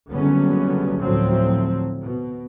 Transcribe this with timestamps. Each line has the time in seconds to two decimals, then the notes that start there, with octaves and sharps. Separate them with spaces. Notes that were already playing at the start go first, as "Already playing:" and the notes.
0.10 F#1 D3 F#3 G3 B3 C#4
1.00 D2 A2 F3 F#3 C4
2.04 B2